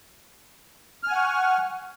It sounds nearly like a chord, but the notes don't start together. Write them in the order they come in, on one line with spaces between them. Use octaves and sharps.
F6 G#5 F#5 C#6